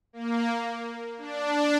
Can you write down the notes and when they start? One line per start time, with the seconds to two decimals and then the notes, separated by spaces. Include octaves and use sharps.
0.13 A#3
1.18 D4